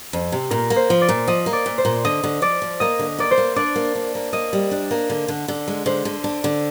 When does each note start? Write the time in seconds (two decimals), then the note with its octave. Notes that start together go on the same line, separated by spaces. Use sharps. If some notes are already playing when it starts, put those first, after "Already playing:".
0.13 F2
0.32 C3
0.51 A#2 A#4
0.70 A#3
0.76 C5
0.90 F3
1.02 D5
1.09 A#2
1.28 F3 D#5
1.46 A#3
1.53 D5
1.66 A#2
1.78 C5
1.85 A#2
2.05 D3 D#5
2.24 D3
2.42 F3 D5
2.62 F3
2.80 A#3 D#5
2.99 D3
3.19 A#3 D5
3.31 C5
3.38 A#3
3.56 D4 D5
3.76 A#3
3.95 D4
4.15 A#3
4.33 A#3 D#5
4.53 G3
4.71 D4
4.91 A#3
5.10 D3
5.28 D3
5.48 D3
5.68 G#3
5.86 D3 C5
6.05 D3
6.24 D4
6.44 D3